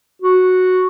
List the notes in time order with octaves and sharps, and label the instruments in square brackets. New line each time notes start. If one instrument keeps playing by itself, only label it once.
[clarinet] F#4